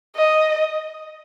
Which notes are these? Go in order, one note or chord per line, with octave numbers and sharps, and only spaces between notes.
D#5